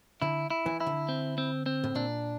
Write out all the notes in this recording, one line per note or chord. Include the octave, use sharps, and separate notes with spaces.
D3 E4
E4
E3
E4
D3
C4
C4
C4
A2
A#2 D4